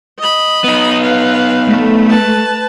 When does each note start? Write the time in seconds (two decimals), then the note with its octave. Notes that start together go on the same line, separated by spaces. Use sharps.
0.19 D#5 B5
0.64 B3 D#4
1.02 B4 F5
1.66 A3
2.09 B4 A5